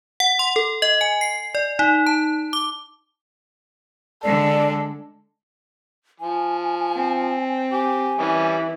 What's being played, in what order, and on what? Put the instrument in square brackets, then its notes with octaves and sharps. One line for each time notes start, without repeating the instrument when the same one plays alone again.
[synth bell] F#5
C6
A4
D#5
G#5
C7
D5
D#4
A5
D6
[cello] D3 G#3 [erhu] A4 [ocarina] D5
[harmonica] F3 [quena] G#5
[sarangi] C4
[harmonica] G4 [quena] G#5
[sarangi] E3 [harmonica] G3 C#4